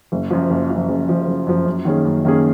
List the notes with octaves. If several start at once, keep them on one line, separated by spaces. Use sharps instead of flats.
F#1
F#2 F3
F#1
F#2 F3
F#1
F#2 F3
F#1
F#2 F3
F#2
D#3 A#3 C#4 G#4
F#2
D#3 A#3 C#4 G#4